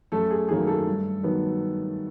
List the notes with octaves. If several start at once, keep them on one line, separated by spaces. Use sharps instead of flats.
F#2 A3 A4
G#4
D#3 F#3 A#3 G#4
A3 A4
G2
D#3 F#3 B3